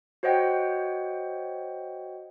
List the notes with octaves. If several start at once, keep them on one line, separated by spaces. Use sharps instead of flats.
F#4 C5 C#5 D#5 F#5 G5